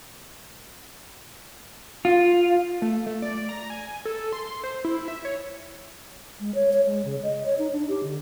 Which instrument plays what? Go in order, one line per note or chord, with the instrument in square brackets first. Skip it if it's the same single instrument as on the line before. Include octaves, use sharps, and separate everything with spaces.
[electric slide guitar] F4
[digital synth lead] A3
A3
D5
A#5
G#5
A4
C6
C5
E4
E5
C#5
[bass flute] G#3
C#5
C#5
G#3
C#3
D#5
C#5
D#4
D4
G4
D3